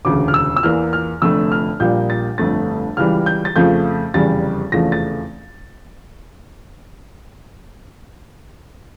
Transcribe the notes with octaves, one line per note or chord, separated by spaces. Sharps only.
E1 D2 C#3 D6
F6
E6
E6
E2 E3 A#3 F6
F6
F1 F2 D3 A3 E6
F6
A#1 A#2 G3 A#3 G6
A6
G1 F2 D3 A3 A6
C#2 C#3 E3 G3 F6
G6
A6
F2 C#3 F3 A3 G6
F1 E2 C#3 G3 A6
F1 E2 C#3 F3 A3 A#6
A6